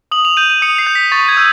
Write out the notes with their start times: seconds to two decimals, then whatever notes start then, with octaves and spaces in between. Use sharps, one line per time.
0.11 D#6 F#7
0.25 F7
0.37 G6 D#7
0.50 D#7
0.62 D#6 C#7
0.78 C7
0.87 G6
0.95 B6
1.12 C#6 A6
1.28 G#6
1.37 E6 G6